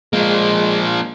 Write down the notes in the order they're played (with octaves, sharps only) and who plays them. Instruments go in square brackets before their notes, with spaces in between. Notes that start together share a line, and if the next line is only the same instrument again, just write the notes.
[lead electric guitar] F3 A#3 [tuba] G#3